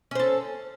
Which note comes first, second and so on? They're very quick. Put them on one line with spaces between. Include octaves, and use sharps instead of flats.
C#4 C5 A4